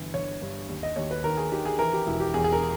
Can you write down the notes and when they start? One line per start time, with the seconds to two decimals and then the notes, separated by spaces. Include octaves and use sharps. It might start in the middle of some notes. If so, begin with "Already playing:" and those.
Already playing: G1 E3
0.14 G1 C#5
0.42 G2
0.69 D#2
0.83 D#5
0.96 D#2 C#5
1.11 B4
1.24 D#3 A#4
1.37 G#4
1.52 D#3 G4
1.65 G#4
1.79 E3 A#4
1.93 G4
2.07 E1 E4
2.20 G4
2.34 E2 G#4
2.44 G#4
2.53 A#4